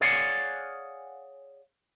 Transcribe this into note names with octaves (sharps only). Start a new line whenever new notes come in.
G#4 C#5 D5 F5 F#5 G#5